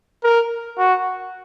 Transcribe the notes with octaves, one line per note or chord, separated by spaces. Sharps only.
A#4
F#4